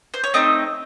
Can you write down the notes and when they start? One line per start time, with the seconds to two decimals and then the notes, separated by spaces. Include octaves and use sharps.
0.14 C5
0.24 C#5
0.34 A3 C4 D#4 D#5